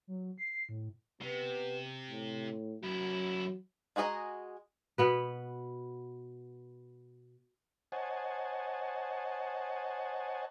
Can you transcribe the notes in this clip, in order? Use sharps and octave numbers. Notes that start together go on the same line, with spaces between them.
F#3
C7
A2
C3 B3
A2
F#2 F#3 E4
G#3 F#4 G#4 D#5 A#5
B2 B3 B4
C5 C#5 D#5 F#5 G#5 A5